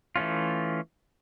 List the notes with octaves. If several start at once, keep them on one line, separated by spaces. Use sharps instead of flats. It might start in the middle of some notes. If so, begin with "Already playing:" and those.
E3 A3 C#4 F4